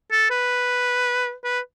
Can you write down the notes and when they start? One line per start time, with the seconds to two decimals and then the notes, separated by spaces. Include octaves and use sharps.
0.11 A4
0.31 B4
1.44 B4